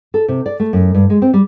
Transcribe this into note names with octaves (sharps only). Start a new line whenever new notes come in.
A4
C3
D5
A3
F#2
G2
G#3
C4
G3